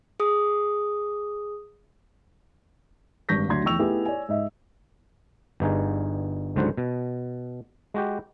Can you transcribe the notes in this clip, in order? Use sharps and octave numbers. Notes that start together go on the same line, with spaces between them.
G#4 D#6
G#1 G2 C#6 G6 A#6 B6
D2 F#3 D4 C6 G#6
F1 E2 G5 C#6 E6 F7
A3 B3 D#4 E4 G4 G#4
C#5 D5 G#5
G#2 D#5 E5
G1 G2 D#4 G#4
C#2 G#2 D3 F#3 C5 F#5
B2
G#3 F#4 G4